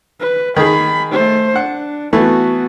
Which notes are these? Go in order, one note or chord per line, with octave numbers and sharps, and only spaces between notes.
B4
D#3 G#4 B5
A3 C5
D4 F#5
E3 A3 B3 F#4